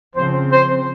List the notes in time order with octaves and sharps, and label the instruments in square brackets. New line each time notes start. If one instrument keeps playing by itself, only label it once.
[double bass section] C#3 F3 C4 [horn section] C5
[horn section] C5